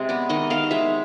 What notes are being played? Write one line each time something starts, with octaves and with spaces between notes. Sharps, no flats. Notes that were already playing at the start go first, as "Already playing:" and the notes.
Already playing: C3 G#3
B3 D5
D#3 D#5
D#3 F5
G#3 E5